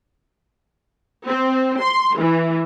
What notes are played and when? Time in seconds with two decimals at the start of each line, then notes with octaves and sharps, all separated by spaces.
1.27 C4
1.80 C6
2.17 E3